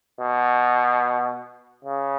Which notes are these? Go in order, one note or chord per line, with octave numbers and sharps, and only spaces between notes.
B2
C#3